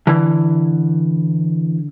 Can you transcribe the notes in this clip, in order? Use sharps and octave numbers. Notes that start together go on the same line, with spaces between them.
D3 E3